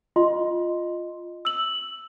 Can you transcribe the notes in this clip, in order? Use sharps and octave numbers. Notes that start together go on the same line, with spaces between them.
F4 D#5 C6
E6 F#7